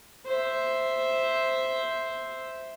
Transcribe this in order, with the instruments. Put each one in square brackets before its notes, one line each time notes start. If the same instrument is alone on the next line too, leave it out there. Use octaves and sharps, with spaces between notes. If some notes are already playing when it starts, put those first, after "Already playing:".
[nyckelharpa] C5 E5